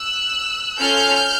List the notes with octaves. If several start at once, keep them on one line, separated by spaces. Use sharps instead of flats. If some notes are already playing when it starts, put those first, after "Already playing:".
Already playing: E6 F#6
C#4 F4 A4 F6 G6